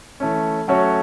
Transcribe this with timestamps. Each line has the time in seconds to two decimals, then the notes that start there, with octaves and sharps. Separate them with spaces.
0.20 E3 A3 C#4
0.68 F#3 A3 C#4 F#4 C#5